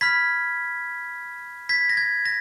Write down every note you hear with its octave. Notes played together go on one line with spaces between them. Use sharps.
B5 F6 G#6 B6
G#6 B6
A#6
G#6
A#6